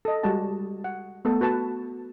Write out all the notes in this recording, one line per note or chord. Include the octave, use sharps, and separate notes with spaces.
A4 D#5
G3 G#3 F#4 G4 A5
F#5
A3 B3 A4
F#4 B4 A5